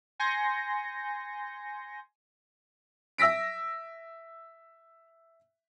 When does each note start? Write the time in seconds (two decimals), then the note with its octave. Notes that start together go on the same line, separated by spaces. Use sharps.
0.20 G#5 C6 G6 A#6 C#7
3.18 E5 E6 A#6 B6 D7